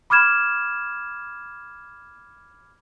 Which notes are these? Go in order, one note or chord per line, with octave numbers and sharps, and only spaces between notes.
B5 D6 F6 G#6 E7